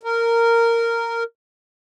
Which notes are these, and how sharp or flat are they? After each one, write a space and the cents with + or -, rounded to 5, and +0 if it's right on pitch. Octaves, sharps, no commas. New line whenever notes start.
A#4 -10